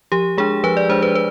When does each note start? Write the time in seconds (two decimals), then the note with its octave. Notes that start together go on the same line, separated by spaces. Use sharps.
0.12 F3 G4
0.38 G#3 D4 G#4
0.64 F3 B4
0.77 D5
0.89 G#3 D4 C5
1.02 B4
1.15 B4